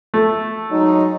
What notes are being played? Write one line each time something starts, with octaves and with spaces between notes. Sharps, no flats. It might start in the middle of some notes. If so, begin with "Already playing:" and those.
A3
F#3 G#3 D#4